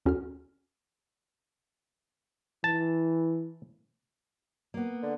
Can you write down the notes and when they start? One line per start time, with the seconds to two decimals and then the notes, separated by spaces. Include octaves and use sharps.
0.06 D#2 C#4 F#4 A4 F6
2.64 E3 A5
4.74 A#3 B3
5.03 D3